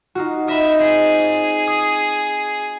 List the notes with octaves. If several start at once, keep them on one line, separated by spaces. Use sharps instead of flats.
D#4 F4 F#4
D#5 E5 B5
C4 G#4
D#6